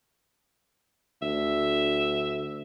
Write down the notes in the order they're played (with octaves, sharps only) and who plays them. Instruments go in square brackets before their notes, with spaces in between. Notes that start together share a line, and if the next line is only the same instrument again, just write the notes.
[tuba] D2 [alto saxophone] E5